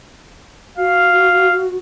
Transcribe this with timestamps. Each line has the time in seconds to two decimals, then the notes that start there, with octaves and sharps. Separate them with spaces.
0.78 F#4 F5